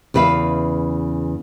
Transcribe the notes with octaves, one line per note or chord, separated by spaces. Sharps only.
E2 C#3 B4 E5 F5